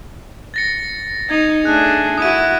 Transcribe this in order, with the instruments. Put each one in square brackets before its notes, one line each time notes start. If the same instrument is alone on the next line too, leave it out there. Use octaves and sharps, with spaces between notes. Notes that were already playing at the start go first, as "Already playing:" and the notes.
[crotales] A6 A#6 C#7
[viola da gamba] D#4 [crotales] G#6
[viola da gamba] A3 D4 G#4 [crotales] F#6
[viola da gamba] E4 F#4 [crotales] D#6 G#6 D#7